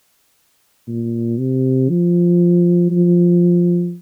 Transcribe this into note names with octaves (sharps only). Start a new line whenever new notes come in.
A#2
C3
F3
F3